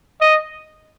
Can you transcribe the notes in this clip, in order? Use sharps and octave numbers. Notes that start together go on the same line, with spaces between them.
D#5